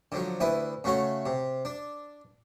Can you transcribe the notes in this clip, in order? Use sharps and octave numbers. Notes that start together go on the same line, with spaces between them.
D3 F3 F#3
D2 E4 B4 D#6
C#3 A3 F#4 C#5
C3
D4